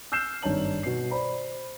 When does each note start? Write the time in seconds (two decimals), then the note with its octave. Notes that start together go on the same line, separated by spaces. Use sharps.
0.12 E6 F6 G6 C7 E7
0.42 G#1 G2 D#4 C#5 A5 F#7
0.83 B2 C7
1.11 C5 D5 B5